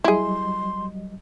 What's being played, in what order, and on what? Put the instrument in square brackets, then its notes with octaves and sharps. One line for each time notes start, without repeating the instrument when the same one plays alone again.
[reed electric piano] F#3 G3 D#5 [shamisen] E4 G#4 [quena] C6